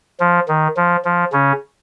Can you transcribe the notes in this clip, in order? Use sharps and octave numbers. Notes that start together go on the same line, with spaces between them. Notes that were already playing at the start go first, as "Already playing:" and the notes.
F3
D#3
F3
F3
C#3 C#4